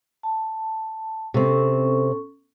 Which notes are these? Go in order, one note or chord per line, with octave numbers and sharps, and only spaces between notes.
A5
C3 C4 C#4 A4 C#6